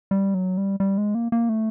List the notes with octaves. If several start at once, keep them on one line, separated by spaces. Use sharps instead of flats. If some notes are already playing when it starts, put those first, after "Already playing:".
G3
F#3
G3
G3
G#3
A#3
A#3
A3